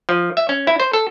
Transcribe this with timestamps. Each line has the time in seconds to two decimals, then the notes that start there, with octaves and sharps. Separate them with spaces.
0.09 F3
0.37 E5
0.49 C#4
0.67 E4
0.80 C5
0.93 A4